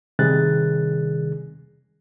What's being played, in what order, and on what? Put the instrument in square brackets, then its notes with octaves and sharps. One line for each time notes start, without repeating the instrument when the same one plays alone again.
[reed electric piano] C3 D#3 G3 G#4 F#6 A6